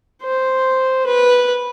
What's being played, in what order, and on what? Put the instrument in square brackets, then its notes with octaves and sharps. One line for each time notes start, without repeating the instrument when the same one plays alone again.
[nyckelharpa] C5
B4